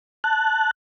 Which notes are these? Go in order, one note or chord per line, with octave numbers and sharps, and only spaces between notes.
A5 F#6